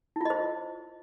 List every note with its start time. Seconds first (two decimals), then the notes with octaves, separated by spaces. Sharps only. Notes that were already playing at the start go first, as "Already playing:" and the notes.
0.16 E4
0.21 F4
0.25 D#5
0.30 C5